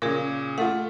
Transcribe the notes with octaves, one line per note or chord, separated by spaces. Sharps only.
A#2 C#3 G#4 A#4
A3 F4 A4 F#5